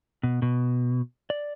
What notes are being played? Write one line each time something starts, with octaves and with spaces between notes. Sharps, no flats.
B2
B2
D5